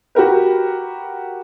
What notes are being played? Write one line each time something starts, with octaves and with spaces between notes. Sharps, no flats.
F#4 G4 A#4 B4